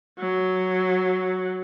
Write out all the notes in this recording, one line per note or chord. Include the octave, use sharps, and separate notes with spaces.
F#3